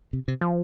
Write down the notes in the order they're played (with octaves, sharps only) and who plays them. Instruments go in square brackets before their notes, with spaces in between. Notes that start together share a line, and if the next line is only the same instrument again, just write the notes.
[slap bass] C3
C3
[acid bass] F3